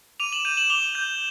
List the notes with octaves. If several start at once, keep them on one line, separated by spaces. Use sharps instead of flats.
D6 D#7 F7
E7 F#7
G6 D#7 F7
E7 F#7
D6 F7 G7
G6